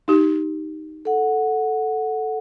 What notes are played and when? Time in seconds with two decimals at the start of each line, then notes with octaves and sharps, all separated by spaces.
0.08 D#4 G4
1.05 A4 F#5